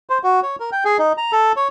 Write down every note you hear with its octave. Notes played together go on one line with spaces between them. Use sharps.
C5
F#4
C#5
A#4
G5
G#4
D#4
A#5
A4
C#5